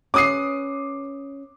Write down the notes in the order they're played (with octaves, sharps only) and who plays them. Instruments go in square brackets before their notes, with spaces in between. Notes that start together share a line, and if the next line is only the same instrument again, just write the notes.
[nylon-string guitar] C#4 B4 [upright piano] D6 D#6 C7